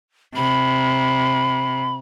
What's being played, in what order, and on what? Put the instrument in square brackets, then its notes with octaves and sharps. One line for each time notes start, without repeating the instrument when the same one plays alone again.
[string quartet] C3 [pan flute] B5